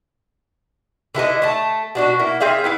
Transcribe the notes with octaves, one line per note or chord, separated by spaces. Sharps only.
D3 E4 A4 D#5
A3 A5
B2 D4 F#4
A#3 E4
C4 G#4 E5 F5
B3 E4 F5